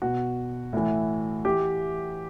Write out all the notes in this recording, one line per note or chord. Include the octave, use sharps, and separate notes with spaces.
B2 F#4
A2 E3
E3 G4